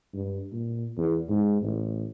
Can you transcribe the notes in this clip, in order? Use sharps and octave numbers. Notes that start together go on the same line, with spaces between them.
G2
A#2
E2
G#2
A1